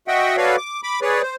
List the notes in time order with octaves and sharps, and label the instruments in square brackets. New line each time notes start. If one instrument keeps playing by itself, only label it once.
[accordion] F#4 D#5 E5 F#5 G5
F#4 A4 B4 C#5 D5 F5
D6
B5 D6
G#4 B4 C#5 D5
C5